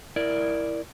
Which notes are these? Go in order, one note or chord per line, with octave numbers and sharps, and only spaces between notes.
E4 A#4 D5